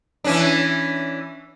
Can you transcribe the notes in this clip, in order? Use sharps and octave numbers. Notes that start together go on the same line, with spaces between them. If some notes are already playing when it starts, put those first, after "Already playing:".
E3 C#4 D4